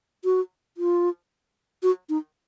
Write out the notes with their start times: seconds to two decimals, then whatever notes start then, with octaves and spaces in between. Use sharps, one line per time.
0.24 F#4
0.77 F4
1.83 F#4
2.09 D#4